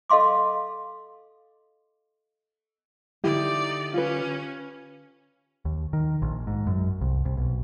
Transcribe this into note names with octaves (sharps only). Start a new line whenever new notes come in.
A4 D#5 F5 C6 D6
D3 D#4 E4 G4 D5
C#4 F4 B4
D#2
D#3
A#1
G#2
F#2
C2
C2
B1